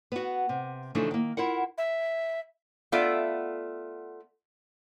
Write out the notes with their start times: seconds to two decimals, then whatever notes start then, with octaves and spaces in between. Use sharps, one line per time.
0.12 B3 F#4
0.49 C3
0.95 C#3 E3 F3 A3 D4 D#4
1.11 D#3 A#3
1.37 E4 F4 A#4 F#5
1.78 E5
2.92 A3 B3 F4 D5 E5